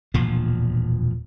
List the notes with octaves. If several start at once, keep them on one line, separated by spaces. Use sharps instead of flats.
E1 D2 A#2 F3